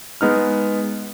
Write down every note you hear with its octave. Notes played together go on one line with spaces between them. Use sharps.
G#3 B3 D#4 F6